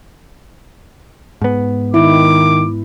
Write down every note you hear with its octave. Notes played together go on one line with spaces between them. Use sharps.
G#2 B3
D#3 E4 D6